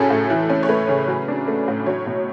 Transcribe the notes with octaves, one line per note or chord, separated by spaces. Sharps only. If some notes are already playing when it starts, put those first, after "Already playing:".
Already playing: A2 C#3 F#3 C#4 G#4 A4
A2
E3
C#4
C#5
A3 B4
C#3
F#3
D4
A3
A2
F#3 C#5
B2